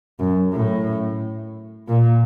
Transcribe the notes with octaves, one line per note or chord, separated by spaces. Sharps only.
F#2
A2
A#2